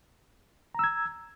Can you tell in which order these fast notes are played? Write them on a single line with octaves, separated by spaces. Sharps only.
A#5 E6 G#6